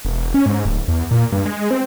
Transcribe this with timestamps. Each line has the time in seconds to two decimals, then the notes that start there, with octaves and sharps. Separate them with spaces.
0.05 E1
0.34 C#4
0.46 G#2
0.65 D1
0.88 E2
1.11 A#2
1.32 G2
1.45 G#3
1.71 C4